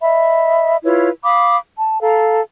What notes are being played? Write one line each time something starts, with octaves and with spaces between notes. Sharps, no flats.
D#5 E5 B5
E4 F4 B4 C#5
F5 B5 D6 D#6
A5
A4 F5 A#5